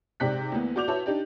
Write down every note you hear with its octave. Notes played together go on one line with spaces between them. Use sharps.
G#2 C3 D5 G5 F#6 B6
D2 E3 A#3 B3
F#4 D5 D6 G6 F7
E4 F#4 B4 C#5 E5 A5
D4 D#4 G4 D5